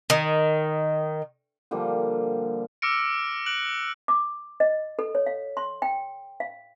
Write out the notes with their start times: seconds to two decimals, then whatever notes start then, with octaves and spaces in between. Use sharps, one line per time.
0.10 D#3
1.71 D3 F3 G3 A#3
2.82 D6 E6 F6 A#6 C#7 D7
3.46 F#6 D7 F#7
4.08 D6
4.60 D#5
4.99 A4
5.15 C#5
5.26 F5
5.57 C6
5.82 G5
6.40 F5